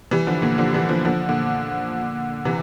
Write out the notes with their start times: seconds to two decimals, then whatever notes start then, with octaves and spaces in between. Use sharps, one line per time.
0.11 E3 G3
0.27 D3 F3
0.42 A#2 D3
0.58 D3 F3
0.74 E3 G3
0.89 D3 F3
1.05 D3 F3
1.29 A#2 D3
2.45 C3 E3